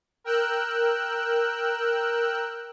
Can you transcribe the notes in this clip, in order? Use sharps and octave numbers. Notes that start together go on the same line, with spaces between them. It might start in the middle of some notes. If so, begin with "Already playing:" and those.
A#4 G5 E6 F#6